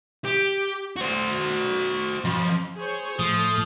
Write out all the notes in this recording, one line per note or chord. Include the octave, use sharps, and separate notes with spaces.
G4
F#4 C5
F3 D#5
G#4 C5 C#5
A2 F3 A3 D#6